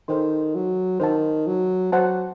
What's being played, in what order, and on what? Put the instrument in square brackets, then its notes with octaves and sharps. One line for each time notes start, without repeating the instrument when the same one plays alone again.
[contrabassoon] D#3 [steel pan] A4 C5 G5 C6
[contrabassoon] F#3
[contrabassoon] D#3 [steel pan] C5 F#5 A5
[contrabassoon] F#3
[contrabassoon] F#3 [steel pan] C5 F#5 A5